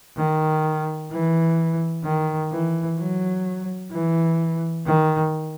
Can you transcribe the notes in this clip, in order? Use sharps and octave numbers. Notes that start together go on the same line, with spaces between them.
D#3
E3
D#3
E3
F#3
E3
D#3